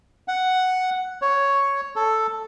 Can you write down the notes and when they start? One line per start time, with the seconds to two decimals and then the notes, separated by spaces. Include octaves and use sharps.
0.28 F#5
1.22 C#5
1.96 A4